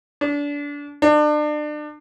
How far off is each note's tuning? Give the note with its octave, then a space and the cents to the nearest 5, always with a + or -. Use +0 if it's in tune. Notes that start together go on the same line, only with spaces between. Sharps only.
D4 -25
D4 +35